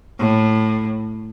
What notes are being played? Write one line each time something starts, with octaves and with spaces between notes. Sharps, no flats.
A2